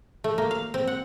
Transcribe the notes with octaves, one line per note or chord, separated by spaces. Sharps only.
A3
A#3
F5
C4
F#5